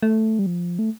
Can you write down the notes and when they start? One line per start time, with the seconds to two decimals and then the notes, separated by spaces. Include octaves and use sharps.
0.03 A3
0.39 G3
0.46 F3
0.79 A3